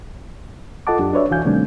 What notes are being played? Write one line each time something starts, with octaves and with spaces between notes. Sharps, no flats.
F4 A4 D#5 F#5 A5 D6
F#2 D4 G4
D4 F#4 B4 C#5 D5 E5
C2 E3 F#4 F5 G#5 G6
C3 D#3 G3 A3 C4 D4